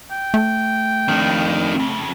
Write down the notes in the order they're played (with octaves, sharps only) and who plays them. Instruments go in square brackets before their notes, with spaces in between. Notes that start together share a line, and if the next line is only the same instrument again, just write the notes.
[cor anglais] G5
[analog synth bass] A3
[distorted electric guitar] F2 D4 [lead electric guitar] D#3
[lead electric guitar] F2 C#3